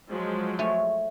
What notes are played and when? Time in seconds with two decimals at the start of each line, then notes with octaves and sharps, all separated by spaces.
0.12 F3 F#3 G#3
0.59 A3 C#5 G#5